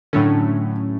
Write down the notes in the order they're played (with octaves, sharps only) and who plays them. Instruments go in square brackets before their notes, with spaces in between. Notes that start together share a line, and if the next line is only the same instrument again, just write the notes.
[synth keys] A2 F#3 A3 C#4 [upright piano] D3